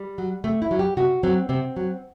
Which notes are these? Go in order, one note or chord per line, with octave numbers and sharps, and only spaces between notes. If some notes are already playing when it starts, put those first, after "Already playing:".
Already playing: G3
F#3
C3 A3
E4
F#3
G4
C3 F#4
F#3 C4
C3 C4
F#3